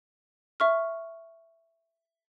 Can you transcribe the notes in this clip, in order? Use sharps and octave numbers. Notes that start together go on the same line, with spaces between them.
E5 C#6 F6